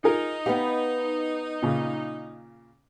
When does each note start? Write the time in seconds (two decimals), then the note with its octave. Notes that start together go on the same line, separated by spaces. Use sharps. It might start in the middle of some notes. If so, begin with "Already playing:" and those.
0.04 D#4 F4 G#4 A#4
0.46 B3 G4 B4 F5
1.63 A#2 C#3